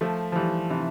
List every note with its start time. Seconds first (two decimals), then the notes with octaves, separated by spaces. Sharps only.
0.01 F3 A3
0.32 F3
0.36 E3 G3
0.70 C3 E3